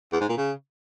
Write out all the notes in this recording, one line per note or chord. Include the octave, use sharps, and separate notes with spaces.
E2
G#2
A#2
C#3